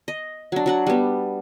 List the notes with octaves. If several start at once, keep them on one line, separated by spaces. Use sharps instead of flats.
D#5
F#3 D4
F#3 D4 F#5
G3 B3